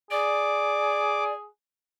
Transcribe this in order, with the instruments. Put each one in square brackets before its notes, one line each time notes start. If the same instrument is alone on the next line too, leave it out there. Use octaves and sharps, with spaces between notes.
[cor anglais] G#4 [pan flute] D5 [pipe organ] D6